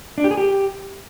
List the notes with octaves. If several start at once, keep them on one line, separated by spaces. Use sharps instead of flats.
D4
G4
G#4
G4